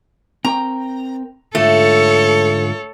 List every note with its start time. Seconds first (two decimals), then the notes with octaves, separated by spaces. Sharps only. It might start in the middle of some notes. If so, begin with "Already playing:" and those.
0.45 C4 A#4 G5 A#5
1.55 G#2 D3 A3 F4 A4 C#5